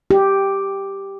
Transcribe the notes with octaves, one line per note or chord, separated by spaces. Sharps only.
G4